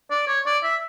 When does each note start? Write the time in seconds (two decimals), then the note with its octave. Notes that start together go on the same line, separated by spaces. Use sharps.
0.10 D5
0.28 C#5
0.46 D5
0.63 E5